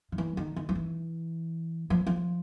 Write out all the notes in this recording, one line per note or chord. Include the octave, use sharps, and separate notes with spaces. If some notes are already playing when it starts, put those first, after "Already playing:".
D#3
E3
D#3
D#3
F3
E3
F3
F3